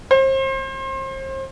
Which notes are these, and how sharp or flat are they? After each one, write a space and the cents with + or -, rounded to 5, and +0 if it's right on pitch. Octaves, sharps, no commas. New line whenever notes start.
C5 +35